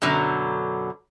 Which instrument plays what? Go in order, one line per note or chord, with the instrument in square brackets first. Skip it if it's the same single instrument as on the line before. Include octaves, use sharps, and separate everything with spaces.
[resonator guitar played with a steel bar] F#2 B2 D3 F#3